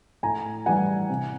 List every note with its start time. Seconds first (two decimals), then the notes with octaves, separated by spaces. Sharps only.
0.23 A2 G#5 A#5
0.66 E3 G3 F#5 G#5
1.09 C3